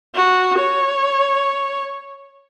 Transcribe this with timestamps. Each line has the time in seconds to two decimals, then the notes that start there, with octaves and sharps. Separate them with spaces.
0.15 F#4
0.58 C#5